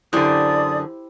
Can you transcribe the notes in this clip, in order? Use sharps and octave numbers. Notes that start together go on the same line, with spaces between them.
F#2 D3 E4 G4 C5 D5 D#6